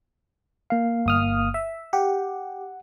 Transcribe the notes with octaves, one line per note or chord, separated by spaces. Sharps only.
A#3 F5
G1 D#6 F6
E5
G4 F#5